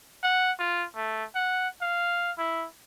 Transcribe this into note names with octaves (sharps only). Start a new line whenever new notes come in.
F#5
F4
A3
F#5
F5
E4